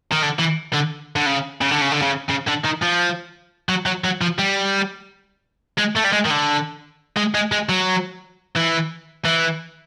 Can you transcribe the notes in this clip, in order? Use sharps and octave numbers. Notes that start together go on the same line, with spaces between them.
D#3
D3
E3
D3
D3
C#3
C#3
D3
C#3
D3
C#3
C#3
D3
D#3
F3
F#3
F#3
F#3
F3
G3
G#3
A3
G3
G#3
D#3
D3
G#3
G#3
G#3
F#3
E3
E3